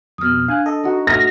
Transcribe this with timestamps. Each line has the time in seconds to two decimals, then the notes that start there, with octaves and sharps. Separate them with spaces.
0.18 F2 B2 D#6 F6
0.48 D4 F5 G#5 F#6
0.66 A4 D#5
0.84 D#4 F#4
1.07 A3 D#6 F6 A#6